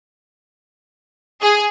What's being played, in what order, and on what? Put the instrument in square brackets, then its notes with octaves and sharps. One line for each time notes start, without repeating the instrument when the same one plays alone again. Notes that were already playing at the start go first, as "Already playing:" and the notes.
[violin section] G#4